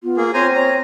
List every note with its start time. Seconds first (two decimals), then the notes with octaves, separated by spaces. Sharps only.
0.03 B3 F4
0.17 A#3 G#4
0.34 C4 C5 C#5 G#5 A#5
0.55 C#5 A#5